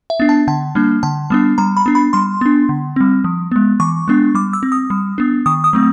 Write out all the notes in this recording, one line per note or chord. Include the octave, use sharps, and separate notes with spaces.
E5
B3 D4
A5
D3 A5
G3 A#3 D4
D3 A5
G3 B3 D4
G3 A#5
B5
B3 D4
B5
G3 C6
B3 D4
D3
G3 C4
F3
G#3 B3
E3 C#6
G#3 B3 D4
G3 D6
E6
C4
D#6
G3
B3 D4
D#3 D#6
D#6
F#3 A3 C4